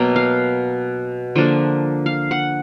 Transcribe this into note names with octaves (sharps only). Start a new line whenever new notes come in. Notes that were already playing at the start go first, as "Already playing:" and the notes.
Already playing: B2 F#3 A#3
F5
D3 F3 A#3 D4
F5
F#5